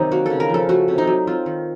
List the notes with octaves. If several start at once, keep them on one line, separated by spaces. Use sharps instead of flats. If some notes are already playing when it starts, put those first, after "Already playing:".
Already playing: C3 D#3 F#3 D#4
A#3 F#4
C#3 A4
A#4
F3 A4
A3 F#4
C3
D#4
F#3
C4 F4
D#3